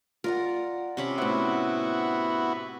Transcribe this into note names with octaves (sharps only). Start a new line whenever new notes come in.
F4 A#4 D5 F#5
C3 C#4 B5
A2 B3 E4 F#4 C5